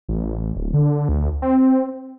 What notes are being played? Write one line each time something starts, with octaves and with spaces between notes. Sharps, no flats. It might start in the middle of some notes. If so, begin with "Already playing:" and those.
A1
D1
D3
D2
C4